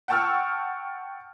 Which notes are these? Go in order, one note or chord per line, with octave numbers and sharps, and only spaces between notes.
F#5 G5 A5 C#6 E6 F6